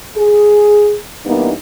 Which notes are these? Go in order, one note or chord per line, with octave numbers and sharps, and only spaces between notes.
G#4
G2 E3 A#3 B3 D#4